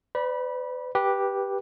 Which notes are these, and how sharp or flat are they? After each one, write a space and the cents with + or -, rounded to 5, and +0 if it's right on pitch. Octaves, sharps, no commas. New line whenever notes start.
B4 +40 D5 +0 B5 -20
G4 +0 B4 -15